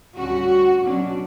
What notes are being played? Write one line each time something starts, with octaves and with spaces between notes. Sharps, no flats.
D2 D3 G3 C#4 F#4
B2 F#3 C#4 D4